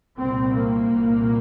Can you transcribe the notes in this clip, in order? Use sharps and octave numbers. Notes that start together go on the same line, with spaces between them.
C2 A#2 C4
A#3
C2 A#2